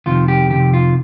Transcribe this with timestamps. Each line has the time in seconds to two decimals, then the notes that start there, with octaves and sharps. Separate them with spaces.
0.06 F2 C3 D#3 F4
0.28 G4
0.50 F2 C3 D#3 G4
0.73 F4